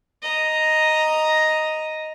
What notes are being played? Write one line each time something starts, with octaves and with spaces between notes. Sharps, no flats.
D#5 A#5